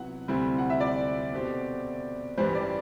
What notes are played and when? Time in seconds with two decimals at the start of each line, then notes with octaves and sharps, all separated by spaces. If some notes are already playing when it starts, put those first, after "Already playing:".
Already playing: C3 F#3 B3 E4 F#5
0.28 D2 C3 G3 C4 E4
0.58 F#5
0.70 E5
0.80 D5
1.32 B2 A3 C4 G4 C5
2.37 A1 G2 E3 G3 C5
2.55 D5